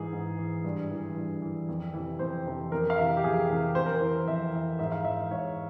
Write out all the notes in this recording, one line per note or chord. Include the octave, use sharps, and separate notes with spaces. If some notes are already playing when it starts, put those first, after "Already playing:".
Already playing: G#2 E3 G#4
G#2
E3
G2
E3
G2
E3
F2
C3 E3
F2 C5
C3 E3
F2 A#4
F5
C3 E3 E5
G4
F2 G#4
C3 E3
F2 C5
A#4
E3 C5
F2 E5
E3
G#2 E5
F5
E3 E5
G#2 C#5